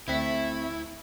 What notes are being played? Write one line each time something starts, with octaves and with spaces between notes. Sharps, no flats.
D2 A3 C4 E4 B6